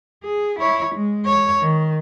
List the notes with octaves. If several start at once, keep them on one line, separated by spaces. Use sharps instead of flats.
G#4
E4 C#5
G#3
C#5
D#3